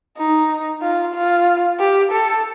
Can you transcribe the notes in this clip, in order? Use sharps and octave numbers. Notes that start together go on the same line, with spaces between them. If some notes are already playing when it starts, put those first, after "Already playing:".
D#4
F4
F4
G4
A4